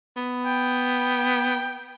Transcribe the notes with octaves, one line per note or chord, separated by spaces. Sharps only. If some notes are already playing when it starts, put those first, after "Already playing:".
B3
G5